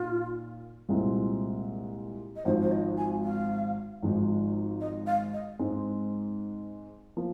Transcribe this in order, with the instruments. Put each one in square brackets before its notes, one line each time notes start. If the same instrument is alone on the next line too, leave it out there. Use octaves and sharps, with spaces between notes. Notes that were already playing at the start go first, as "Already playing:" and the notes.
Already playing: [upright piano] A#2 D#4 [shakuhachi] F4
[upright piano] C2 A#2 G#3 C4
[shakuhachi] D#5
[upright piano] G#1 G#2 F3 [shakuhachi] C5
[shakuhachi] C5
D#5
G#5
F5
[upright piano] G#1 G#2 F3 G#3 D#4
[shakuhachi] D#5
F5
D#5
[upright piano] G#2 G#3 C4 D#4
F3 A#3